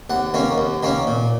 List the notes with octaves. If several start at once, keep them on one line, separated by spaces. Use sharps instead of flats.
D#2 F#5
D#3 A#3 C#4
D#2
D#3 A#3 C#4
A#2